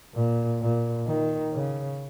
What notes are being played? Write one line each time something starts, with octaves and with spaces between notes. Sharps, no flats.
A#2
A#2
D#3
C#3